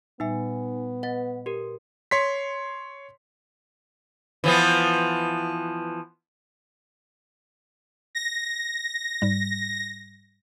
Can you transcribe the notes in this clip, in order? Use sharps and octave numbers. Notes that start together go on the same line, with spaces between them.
A#2 G3 B3 D#4 E5 G#5
B4 D#5 F#5 A6
G4 A#4
C#5 C6 B6
E3 F3 B3
A#6
G#2 G3